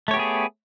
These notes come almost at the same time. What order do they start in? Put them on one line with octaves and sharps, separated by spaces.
A3 C#5 G4 B3 G#4